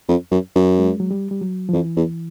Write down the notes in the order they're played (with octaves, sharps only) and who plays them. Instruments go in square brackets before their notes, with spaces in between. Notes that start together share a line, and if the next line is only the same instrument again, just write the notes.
[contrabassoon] F2
F#2
F#2
[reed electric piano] G#3
F#3
G3
G3
F#3
F3
[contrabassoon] F2 [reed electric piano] E3
[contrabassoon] E2